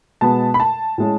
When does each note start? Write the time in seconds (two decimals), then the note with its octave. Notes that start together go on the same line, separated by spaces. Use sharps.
0.21 B2 G#3 B3 A5
0.54 B5
0.60 A5
0.98 A2 G#3 C#4